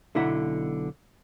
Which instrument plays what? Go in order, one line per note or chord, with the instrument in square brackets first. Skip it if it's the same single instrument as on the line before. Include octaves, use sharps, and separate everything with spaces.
[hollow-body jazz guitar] B1 D3 E4 E5 F#5